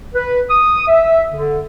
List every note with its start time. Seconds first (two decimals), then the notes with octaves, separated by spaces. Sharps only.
0.15 B4
0.50 D#6
0.88 E5
1.30 D3